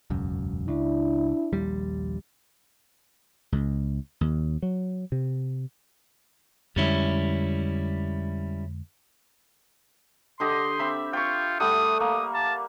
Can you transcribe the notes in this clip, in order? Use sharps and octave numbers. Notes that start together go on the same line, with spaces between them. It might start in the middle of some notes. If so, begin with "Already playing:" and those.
E1 C#2 F#2
C#2 D4 E4
A#1 D#2 G3
C#2
D#2
F#3
C3
F2 D3 G3 G#3 C#4 E4
D3 G4 D#5 C6
C4 E5 B5
F4 G5 C#6
G3 A3 F#5 D#6
A#3 D#6
A5